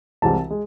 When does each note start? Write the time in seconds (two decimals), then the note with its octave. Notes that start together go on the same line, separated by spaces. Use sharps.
0.22 C2 C3 E3 G#3 A5
0.50 G#3